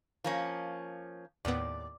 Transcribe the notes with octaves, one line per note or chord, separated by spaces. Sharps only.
F3 A#3 C#4
D#2 A2 B3 D5